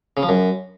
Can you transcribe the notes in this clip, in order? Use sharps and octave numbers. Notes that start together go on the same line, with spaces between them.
C#3
F3
F#2